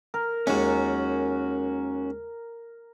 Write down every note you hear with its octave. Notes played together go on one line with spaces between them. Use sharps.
A#4
D#2 G#3 C#4 F#4